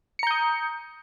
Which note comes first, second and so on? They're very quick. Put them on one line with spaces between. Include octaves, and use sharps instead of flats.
C#7 A#5 G6 D#6